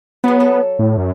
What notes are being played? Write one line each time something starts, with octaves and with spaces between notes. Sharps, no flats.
F#3 B3 G#4
A4
A2
F#2